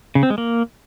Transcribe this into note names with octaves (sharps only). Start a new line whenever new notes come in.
C#3
C4
G#3
A#3